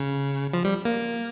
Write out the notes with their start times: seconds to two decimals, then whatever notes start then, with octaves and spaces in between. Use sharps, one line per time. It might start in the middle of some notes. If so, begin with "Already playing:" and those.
Already playing: C#3
0.54 F3
0.65 G3
0.85 A#3